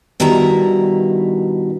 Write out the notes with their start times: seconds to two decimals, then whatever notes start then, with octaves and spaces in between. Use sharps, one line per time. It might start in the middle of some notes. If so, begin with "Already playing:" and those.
0.20 G2 B2 D#3 E4 E5 A#5